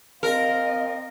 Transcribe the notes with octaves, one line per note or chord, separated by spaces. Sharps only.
C4 A#4 D#5 F5